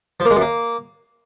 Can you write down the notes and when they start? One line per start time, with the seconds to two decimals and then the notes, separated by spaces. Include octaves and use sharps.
0.20 F3
0.25 A#3
0.30 G#3
0.36 F#2
0.41 A#3